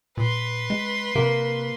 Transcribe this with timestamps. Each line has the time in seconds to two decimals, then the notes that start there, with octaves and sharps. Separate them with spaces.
0.17 A#2 B4 C6
0.70 G#3
1.15 C3 A#3